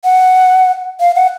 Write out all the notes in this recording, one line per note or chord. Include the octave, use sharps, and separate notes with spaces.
F#5
F5
F#5